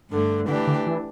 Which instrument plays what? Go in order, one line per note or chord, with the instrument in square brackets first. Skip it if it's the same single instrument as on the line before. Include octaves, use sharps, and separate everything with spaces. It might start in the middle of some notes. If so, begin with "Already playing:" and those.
[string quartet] G2 D3 A3
[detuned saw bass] D3 [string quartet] E3 A3 D4 G4
[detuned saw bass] D3
E3